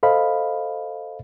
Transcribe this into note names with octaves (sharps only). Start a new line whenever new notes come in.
A4 C5 D#5 F5 B5